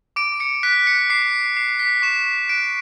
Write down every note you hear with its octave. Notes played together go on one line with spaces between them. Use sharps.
D6 D7
C#7
F#6 B6
C#7
D6 C7
D6 C7
B6
C#6 E7
F#6 D7